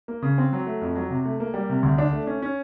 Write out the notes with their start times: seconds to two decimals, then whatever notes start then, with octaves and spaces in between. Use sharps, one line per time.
0.08 A#3
0.22 C#3
0.38 C4
0.53 F#3
0.67 A3
0.81 F2
0.95 F#3
1.10 C3
1.25 A3
1.40 A#3
1.54 G3
1.69 C3
1.83 D2
1.98 D4
2.13 A3
2.27 C#4
2.42 C#4